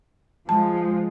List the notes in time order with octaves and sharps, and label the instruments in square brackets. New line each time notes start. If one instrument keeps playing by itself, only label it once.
[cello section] F3 [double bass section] G#3 [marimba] A5